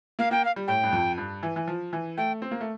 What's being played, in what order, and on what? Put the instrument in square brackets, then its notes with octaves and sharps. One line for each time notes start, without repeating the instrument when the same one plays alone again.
[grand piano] A#3 [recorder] F5
[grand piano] A#3 [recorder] G5
[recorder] F5
[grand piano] G3
[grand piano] A2 [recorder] G5
[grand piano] G2
F2
G2
E3
E3
F3
E3
[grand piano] A3 [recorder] G5
[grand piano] C4
A#3
A3